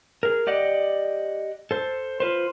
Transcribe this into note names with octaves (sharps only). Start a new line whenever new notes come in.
G#4 A#4
G4 D5 D#5 F#5
A4 C5
F4 B4 C5